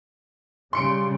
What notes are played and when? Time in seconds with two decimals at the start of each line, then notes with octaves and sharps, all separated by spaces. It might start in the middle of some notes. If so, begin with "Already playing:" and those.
0.73 C#3 G3 C6 C#7 D7